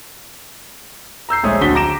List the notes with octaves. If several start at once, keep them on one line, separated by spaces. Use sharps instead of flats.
A#5 E6 G6 C7
A#1 G#3 A3 C#5 D#6
D1 A#1 D3 F#4 B6 G7
A#5 D6 A#6 D7 E7